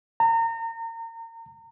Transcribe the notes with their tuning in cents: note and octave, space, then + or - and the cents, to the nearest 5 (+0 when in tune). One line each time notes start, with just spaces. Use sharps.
A#5 -30